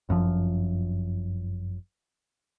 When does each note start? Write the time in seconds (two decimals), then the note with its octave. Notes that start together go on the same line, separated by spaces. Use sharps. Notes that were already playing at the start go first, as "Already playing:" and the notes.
0.09 G1 F#2 A2 F3